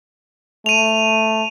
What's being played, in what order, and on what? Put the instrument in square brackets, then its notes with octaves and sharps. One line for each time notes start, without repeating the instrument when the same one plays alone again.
[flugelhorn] A3 [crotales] D#7 F7